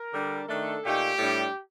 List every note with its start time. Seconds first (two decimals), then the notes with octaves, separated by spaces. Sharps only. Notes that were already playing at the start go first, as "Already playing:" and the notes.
Already playing: A#4
0.13 D3 G3 D4
0.48 D#3 A3 D4 A4
0.84 A#2 A3 D#4 G4
1.18 A2 G3 D4